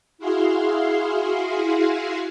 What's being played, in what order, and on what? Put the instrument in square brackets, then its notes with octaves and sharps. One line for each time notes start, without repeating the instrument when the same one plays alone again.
[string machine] E4 F#4 G#4 F5 C6